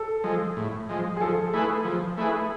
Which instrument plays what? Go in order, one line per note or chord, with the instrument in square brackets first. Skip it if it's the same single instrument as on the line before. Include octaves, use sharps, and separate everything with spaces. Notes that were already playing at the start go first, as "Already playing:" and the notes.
Already playing: [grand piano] A4
[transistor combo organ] F3 G#3
A2
F3 G#3
[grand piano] G#4
[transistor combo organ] F3 [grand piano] A4
[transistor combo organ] A3 E4 G#4 B4
F3
A3 E4 G#4 B4